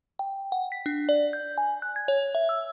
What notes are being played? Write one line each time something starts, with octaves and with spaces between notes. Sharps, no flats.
G5
F#5
B6
D4
D5
G6
G#5
F#6
G#6
C#5
E5
E6